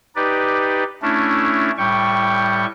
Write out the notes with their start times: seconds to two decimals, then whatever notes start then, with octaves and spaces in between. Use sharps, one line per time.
0.16 D#4 G4 B4 D5
1.02 A3 C#4 D4 E4
1.78 A2 G3 G5 C#6